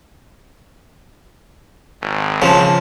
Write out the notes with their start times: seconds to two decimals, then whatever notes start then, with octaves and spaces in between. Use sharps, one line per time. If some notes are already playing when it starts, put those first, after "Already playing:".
2.02 G#1
2.42 C#3 F3 C#5 A5 C6